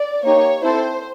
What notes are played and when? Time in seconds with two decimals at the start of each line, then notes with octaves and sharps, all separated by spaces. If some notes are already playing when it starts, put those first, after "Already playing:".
Already playing: D5
0.24 A#3 D#4 G4 C#5
0.63 C4 E4 A4 C5